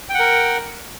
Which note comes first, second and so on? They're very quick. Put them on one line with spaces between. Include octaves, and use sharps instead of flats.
G5 F#5 A#4